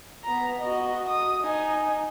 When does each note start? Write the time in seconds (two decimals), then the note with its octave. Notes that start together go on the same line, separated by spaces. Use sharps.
0.24 B3 A#5
0.59 F#4 D#5
1.09 D#6
1.42 D#4 G#5